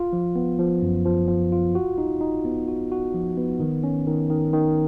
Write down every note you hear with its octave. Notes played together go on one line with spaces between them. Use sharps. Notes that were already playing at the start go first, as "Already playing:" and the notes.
Already playing: F4
F3
B3
F3
F#2
F3
F3
F4
F#4
D#4
D#4
B3
F#4
F#4
F3
B3
D#3
C#4
D#3
D#3
D#3